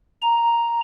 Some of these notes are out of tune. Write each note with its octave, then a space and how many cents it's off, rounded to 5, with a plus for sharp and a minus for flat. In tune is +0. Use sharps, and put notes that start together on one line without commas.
A#5 +0